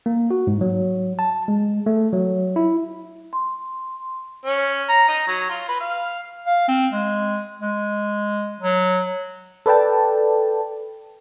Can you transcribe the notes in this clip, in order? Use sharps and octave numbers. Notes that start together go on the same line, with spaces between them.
A#3
F#4
G#2
F#3
A5
G#3
A3
F#3
E4
C6
C#4
A#5
D#4
F#3
F4
B4
F5
F5
C4
G#3
G#3
F#3
A4 B4 D5 G5 A5